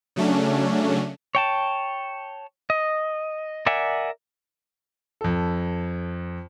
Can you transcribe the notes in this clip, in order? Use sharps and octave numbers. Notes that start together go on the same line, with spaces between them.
C#3 F#3 A3 C#4 D4
C#5 G5 A5
D#5
A#4 D5 E5 F#5 G#5
F2 A4